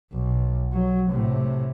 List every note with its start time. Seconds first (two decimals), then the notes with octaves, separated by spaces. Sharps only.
0.13 B1
0.72 F#3
1.10 A2 C3